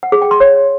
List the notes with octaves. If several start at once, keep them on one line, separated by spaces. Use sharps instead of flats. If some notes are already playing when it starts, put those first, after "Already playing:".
F#5
G#4
G5
C6
C#5